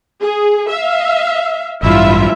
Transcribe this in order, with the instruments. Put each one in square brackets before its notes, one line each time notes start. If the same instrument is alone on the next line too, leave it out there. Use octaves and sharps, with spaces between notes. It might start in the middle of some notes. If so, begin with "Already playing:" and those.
[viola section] G#4
E5 F5
[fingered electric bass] A1 G2 [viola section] E4 F4 E5